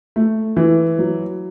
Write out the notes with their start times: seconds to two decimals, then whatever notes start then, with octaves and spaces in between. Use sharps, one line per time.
0.16 A3
0.57 E3
0.99 F#3